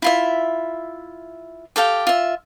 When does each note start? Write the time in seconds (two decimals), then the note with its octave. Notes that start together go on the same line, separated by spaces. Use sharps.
0.02 E4 F4 E5
1.76 G4 A4 F5 G5
2.07 F4 E5